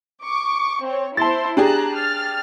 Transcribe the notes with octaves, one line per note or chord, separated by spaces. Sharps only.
C#6 D6
C4 C#5
E4 C5 A5 C6 A6
D4 G4 G#4 A5 A#5 F#6
F6 A6